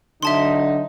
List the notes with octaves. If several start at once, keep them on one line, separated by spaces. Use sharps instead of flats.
D3 F#3 D#4 E5 A5 C6